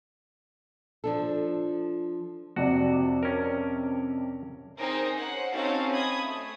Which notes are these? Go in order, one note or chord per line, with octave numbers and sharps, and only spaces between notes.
F3 D4 A4
F2 C3 F#4 D5
C#4 A#4
C4 D#4 G#4 A#4 C5
C#4 C5 F#5
C4 C#4 D#4 F#4 A4 F5
B5 D#6 G#6
A3